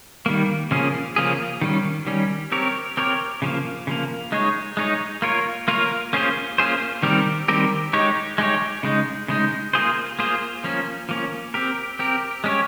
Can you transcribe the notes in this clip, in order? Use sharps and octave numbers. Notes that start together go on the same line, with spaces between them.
D#3 G3 A#3
C#3 F3 A#3 C#4 G#4
C#3 F3 A#3 C#4 G#4
D#3 G3 C#4
D#3 G3 C#4
C4 G4 A#4 C#5
C4 G4 A#4 C#5
C#3 F3 A#3
C#3 F3 A#3
G#3 D#4 G#4 C#5
G#3 D#4 G#4 C#5
A#3 F4 A#4 C#5
A#3 F4 A#4 C#5
A#3 C#4 F4 G#4 C5
A#3 C#4 F4 G#4 C5
D#3 G3 C4 G4 A#4
D#3 G3 C4 G4 A#4
G#3 D#4 G4 C#5
G#3 D#4 G4 C#5
C#3 G#3 D#4
C#3 G#3 D#4
A#3 F4 G#4 C5
A#3 F4 G#4 C5
F3 A#3 C#4
F3 A#3 C#4
C4 G4 A#4
C4 G4 A#4
G#3 C#4 G4 C#5